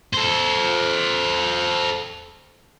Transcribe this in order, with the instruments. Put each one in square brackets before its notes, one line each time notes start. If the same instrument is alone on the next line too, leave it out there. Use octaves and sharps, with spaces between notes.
[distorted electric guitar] A4 C5